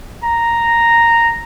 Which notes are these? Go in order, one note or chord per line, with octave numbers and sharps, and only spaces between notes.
A#5